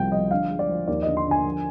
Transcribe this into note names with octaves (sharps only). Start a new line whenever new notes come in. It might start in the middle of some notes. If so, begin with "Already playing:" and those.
Already playing: C2 F3 G5
F3 D#5
D3 F5
G#3
D5
F3
D#2 D5
D3 D#5
C6
D3
G#5
F3